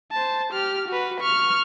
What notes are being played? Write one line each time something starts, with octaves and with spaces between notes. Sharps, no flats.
C5 A5
G4 F6
F#4 B4
C#6 F6